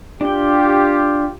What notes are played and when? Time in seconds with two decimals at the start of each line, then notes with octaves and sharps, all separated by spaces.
0.21 D4 F4 G4 G5